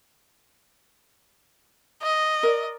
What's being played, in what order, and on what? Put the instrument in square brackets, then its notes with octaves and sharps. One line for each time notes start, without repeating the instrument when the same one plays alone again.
[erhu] D#5
[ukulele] A#4 D5